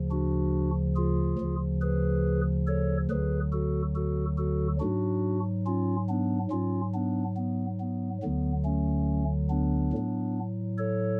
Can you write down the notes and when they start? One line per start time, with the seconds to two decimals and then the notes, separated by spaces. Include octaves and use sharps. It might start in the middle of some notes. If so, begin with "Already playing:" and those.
Already playing: D2 C#3 F3
0.11 D4 F#4
0.96 F4 G#4
1.39 D2 C#3 F3
1.81 G#4 B4
2.67 A4 C#5
3.10 D2 D3 F#3 G#4 B4
3.52 F#4 A4
3.96 F#4 A4
4.38 F#4 A4
4.80 G#2 F#3 D4 F#4
5.66 C#4 F4
6.09 B3 D4
6.51 G#2 F#3 C#4 F4
6.94 B3 D4
7.37 B3
7.80 B3
8.22 D2 D3 F#3 B3
8.65 A3 C#4
9.50 B3 D4
9.93 A2 F#3
10.78 A4 C#5